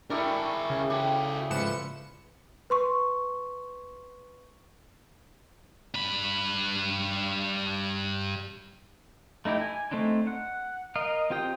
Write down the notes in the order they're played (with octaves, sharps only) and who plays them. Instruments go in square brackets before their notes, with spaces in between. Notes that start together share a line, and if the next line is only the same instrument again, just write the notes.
[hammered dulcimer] G3 E4 [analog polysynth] D4 C#6 [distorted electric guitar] G#4 A#4
[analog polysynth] C#3
[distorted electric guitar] F#4 A4 [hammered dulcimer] G4
[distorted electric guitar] G#2 C#3 [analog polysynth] F3 C#7 E7 [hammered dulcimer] B4
[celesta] B4 C6 C#6
[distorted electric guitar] G2 B5
[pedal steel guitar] A3 D#4 E4 G4
G#5
A3 C4 D4 D#4
F#5
A#4 D#5 F5
C4 F4 G4 G5 D#6